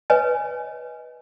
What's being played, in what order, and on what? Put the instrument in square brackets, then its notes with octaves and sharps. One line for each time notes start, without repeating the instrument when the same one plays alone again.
[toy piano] B4 C#5 D#5 G#5